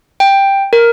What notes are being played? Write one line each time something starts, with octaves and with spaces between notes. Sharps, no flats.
G5
A#4